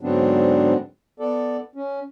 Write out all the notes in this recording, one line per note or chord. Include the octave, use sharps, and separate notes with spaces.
G#2 D3 F#3 B3 C4 D4
B3 A4 D5
C#4